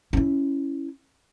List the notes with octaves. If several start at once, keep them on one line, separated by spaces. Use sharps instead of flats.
C#4 E4